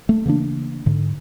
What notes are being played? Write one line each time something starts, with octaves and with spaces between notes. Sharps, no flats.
A3
C#3 E3 A#3 D4
G#2 D3